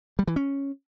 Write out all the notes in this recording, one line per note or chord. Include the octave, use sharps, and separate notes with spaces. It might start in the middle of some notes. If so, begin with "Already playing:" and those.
G3
E3
C#4